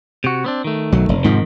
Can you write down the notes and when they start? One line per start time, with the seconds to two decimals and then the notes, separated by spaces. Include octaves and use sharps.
0.24 C3 F#4
0.44 B3 C4 D4
0.64 D#3 A3
0.92 B1 F#3
1.09 F1
1.24 F2 G#2 C3 D#3 F3